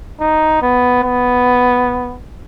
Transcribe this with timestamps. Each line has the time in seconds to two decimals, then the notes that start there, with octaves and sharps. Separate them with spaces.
0.20 D#4
0.62 B3
1.03 B3